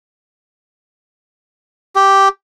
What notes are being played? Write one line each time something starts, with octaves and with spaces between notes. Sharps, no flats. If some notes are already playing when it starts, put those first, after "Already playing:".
G4